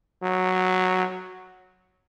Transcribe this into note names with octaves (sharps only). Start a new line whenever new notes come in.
F#3